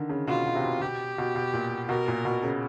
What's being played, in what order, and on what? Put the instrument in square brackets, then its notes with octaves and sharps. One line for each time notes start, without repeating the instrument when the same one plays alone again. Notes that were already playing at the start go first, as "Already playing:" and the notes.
Already playing: [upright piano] D3 D#3
C#3
[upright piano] B2 [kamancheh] F4
[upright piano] B2
C3
B2
[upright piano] B2 [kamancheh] G4
[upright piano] B2
B2
A#2
[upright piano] B2 [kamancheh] A#4
[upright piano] A#2
B2
C#3